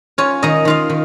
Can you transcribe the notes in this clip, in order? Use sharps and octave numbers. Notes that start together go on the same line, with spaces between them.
C#4 F4 C#5
D#3 D#4 D#5
D#3 F4 F5
D#3